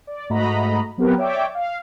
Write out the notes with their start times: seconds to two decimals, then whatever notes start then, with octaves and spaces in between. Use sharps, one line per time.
0.07 D5
0.30 G#2 A3 F#4 D#5 A#5 B5
0.98 F#3 B3 C4 G4 A#4 B4
1.18 C#5 D5 E5 G5 D6
1.55 F5